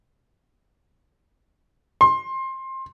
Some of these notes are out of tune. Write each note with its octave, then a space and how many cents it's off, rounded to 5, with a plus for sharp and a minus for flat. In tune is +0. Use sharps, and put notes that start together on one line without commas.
C6 +20